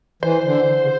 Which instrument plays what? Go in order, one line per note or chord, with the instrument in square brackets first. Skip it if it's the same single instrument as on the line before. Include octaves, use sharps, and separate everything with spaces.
[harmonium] E3 [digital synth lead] C5
[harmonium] D3
C#3